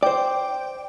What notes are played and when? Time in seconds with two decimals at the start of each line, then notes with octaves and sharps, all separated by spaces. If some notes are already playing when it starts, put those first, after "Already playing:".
0.03 C5 D5 G5